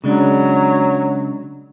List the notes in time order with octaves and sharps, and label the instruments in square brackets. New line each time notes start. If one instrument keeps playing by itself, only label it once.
[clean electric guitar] C#3 G#3 D4 [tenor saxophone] F#3